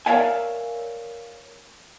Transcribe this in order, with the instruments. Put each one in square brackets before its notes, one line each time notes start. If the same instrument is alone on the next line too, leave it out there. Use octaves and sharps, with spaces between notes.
[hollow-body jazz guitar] A#4 C#5 D5 E5 F5 G#5